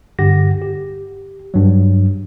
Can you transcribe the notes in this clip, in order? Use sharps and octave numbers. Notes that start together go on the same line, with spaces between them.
G2 D3 G4 F#5 A#6
G4
G2 F#3